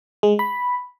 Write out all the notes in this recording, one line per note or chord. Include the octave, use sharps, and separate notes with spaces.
G#3
B5